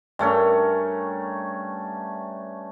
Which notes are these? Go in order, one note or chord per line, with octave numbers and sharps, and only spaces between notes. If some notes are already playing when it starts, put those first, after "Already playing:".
G2 A3 C#4 A#4